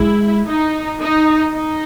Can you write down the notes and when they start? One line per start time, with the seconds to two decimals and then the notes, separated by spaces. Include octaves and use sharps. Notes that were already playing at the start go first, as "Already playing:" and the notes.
Already playing: G#3 E4
0.46 D#4
1.00 D#4
1.52 D#4